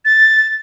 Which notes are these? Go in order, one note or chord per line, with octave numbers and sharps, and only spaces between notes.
A6